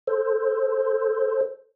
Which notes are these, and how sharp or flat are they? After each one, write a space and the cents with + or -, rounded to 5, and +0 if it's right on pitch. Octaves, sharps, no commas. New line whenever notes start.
A4 +0 C5 +0